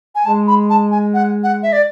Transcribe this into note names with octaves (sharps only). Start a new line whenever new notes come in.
G#5
G#3 A5
B5
A5
G#5
F#5
F#5
E5
D5